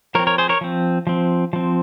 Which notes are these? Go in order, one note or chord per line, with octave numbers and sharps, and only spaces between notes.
F3 C4 A#4 C#5
A#4 C#5
G#4 C5
A#4 C#5
F3 C4
F3 C4
F3 C4